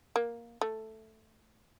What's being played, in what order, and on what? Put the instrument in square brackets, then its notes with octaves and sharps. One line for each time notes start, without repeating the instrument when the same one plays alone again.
[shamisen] A#3
A3